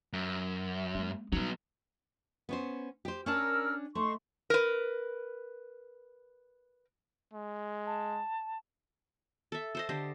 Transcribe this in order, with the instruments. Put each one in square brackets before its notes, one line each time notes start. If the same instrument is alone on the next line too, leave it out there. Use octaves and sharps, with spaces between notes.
[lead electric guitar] F#2
[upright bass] G#3 A#3
[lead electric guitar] F#3 B3 [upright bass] G3 D#4
[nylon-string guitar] B3 C#4 C5
G4 C5
[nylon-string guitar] C#4 D4 A5 [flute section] A#4 E6 F6
[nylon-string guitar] A3 [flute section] D#4 C6 C#6
[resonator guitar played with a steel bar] A#4 B4
[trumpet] G#3
[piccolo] A5
[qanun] A4 E5
A4 C5 D#5
D3 G4 C5 D#5